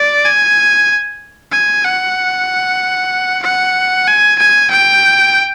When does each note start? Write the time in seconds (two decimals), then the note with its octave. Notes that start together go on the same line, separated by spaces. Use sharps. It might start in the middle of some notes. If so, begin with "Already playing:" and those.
Already playing: D5
0.25 G#5
1.52 G#5
1.84 F#5
3.43 F#5
4.07 G#5
4.39 G#5
4.71 G5